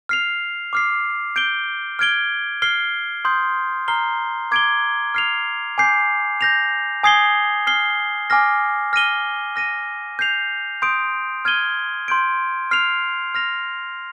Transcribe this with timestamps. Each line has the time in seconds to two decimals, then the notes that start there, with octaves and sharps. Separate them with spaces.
0.09 F6 C7 F7
0.73 D6 F6 C7
1.36 G6 D7 G7
1.99 F6 G#6 D7 G7
2.62 F6 C7 G7
3.25 C6 D#6 G6
3.88 A#5 F6 C7 G7
4.51 D6 G#6 D7 G7
5.14 F6 C7 F7
5.78 G#5 D6 G6 C7
6.41 G6 A#6 F7
7.03 G#5 D#6 G#6 C7 G7
7.67 F6 C7 G7
8.30 G#5 D6 F6 A#6
8.93 F6 A#6 D#7 G7
9.56 F6 A#6 D#7
10.19 G6 C7 F7
10.82 C6 D#6 G6 D7
11.45 F6 G#6 D#7 G7
12.08 C6 G6 D7
12.71 F6 C7 F7
13.35 F6 A#6 F7